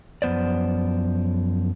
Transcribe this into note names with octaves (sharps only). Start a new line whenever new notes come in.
F#2 F3 B3 C5 D5